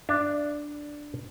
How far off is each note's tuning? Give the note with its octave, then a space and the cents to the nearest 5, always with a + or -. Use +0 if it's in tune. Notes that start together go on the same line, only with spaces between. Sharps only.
D4 +0 E5 +35